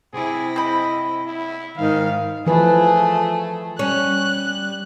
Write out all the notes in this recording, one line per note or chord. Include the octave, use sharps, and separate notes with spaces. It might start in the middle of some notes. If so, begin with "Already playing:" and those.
C3 E4 G#4
C4 D#5 B5
E4
G#2 D#3 F5
E3 F3 A3 G#4 B4
G3 C#4 F#6